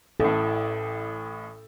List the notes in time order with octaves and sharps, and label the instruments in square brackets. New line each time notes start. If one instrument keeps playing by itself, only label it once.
[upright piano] A1 A2 [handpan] A4